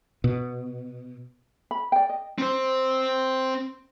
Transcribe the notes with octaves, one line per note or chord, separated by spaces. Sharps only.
B2
B5
D5 G5
D#5
C4 C5